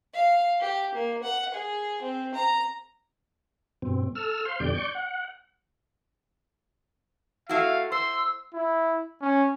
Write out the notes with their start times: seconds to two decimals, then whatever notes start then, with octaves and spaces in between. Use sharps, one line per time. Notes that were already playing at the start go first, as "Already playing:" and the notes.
0.14 F5
0.61 G4
0.95 A#3
1.23 F#5
1.54 G#4
2.02 C4
2.35 A#5
3.82 G2 B2 C4
4.15 A4 E6 F6
4.45 C5 F5 C6
4.60 F2 B2 D3 G3 D5 G6
4.75 D5 C#6 G6
4.95 F#5
7.49 A3 E4 F#4 F5
7.92 C5 C6 E6
8.54 E4
9.21 C#4